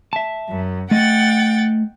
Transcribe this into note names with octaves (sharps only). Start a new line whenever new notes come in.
E5 A5
F#2
A3 D#5 F#5 G5 A6